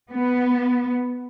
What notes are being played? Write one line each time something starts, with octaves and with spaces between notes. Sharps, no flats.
B3